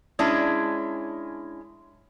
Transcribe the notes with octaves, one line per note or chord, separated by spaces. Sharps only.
G#3 C#4 D4 E4